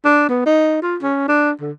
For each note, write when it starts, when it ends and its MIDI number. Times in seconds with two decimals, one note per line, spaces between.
0.05 0.26 62
0.29 0.43 59
0.46 0.82 63
0.82 0.97 65
1.02 1.24 61
1.28 1.51 62
1.61 1.71 50